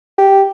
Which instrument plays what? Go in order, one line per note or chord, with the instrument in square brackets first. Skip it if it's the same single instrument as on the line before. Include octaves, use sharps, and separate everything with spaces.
[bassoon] G4